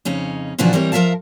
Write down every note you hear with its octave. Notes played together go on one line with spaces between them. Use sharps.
F2 C#3 C#4 D#4
A#2 C#3 E3 F3 D4 F#4
E3 G3 C4 A#4 C#5
F3 A#4 D5 E5 F5 A5